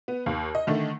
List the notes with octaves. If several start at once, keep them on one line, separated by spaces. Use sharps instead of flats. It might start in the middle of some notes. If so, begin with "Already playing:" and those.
B3
D#2 F5
D#5
D3 D#3 A3